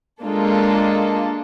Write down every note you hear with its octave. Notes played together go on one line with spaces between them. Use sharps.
G#3 A#3 D4 F4 A4